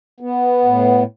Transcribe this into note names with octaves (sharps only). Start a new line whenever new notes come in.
B3
A2